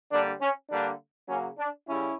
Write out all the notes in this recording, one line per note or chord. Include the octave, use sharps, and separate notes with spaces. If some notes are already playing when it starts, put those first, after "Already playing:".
D3 G3 A#3 D4
C#4
D3 G3 A#3 D4
C#3 F#3 A#3 C#4
D4
C#3 G3 C#4 E4